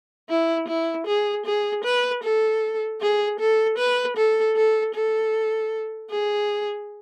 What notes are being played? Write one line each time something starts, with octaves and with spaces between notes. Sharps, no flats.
E4
E4
G#4
G#4
B4
A4
G#4
A4
B4
A4
A4
A4
G#4